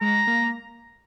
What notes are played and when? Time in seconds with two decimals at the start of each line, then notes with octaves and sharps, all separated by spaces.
0.01 G#3 A#5
0.27 A#3